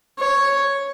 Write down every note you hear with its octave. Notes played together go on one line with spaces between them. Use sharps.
C#5